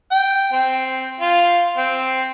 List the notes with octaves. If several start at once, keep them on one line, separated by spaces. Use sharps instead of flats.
G5
C4
F4
C4